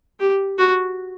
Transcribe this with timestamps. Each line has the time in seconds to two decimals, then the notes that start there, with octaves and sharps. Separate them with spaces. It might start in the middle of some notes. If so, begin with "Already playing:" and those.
0.20 G4
0.58 F#4